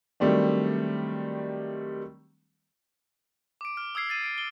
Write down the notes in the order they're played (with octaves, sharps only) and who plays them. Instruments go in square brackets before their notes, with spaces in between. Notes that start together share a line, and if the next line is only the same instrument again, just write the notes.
[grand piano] D#3 F#3 G3 A3 C4 D4
[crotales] D6 D7
F6
D#6 E6 G#6 C7
A6 C7 D#7
C7 D7
D7 G7